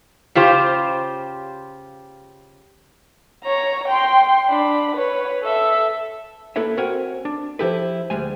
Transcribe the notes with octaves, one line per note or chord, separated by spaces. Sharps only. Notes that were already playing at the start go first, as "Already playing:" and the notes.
C#3 F4 G4 C5
C#5 A#5
G5 C6
D4 B5
B4 C#5
A4 E5
A#3 E4 A4 B4 C#5 E5
C4 F#4 A#4 C#5 F#5 G#5
D4
F3 G3 E4 G4 A4 B4
D2 G3 G#3 G#5